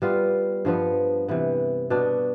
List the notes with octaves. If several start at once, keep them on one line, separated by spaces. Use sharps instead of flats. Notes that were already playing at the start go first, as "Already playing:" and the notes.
G3 B3 F4
G2 F3 B3
C3 E3 B3
B2 B3 D4